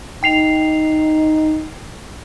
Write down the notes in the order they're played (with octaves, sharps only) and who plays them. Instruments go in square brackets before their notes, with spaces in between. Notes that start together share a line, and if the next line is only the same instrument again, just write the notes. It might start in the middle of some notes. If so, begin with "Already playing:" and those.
[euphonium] D#4 [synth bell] G5 C7 F7